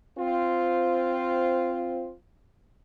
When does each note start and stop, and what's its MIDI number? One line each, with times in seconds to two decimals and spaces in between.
0.18 2.13 60
0.18 2.13 65
0.18 2.13 72